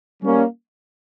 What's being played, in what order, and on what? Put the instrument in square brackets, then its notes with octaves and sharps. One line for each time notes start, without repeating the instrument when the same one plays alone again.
[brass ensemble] G3 A#3 C#4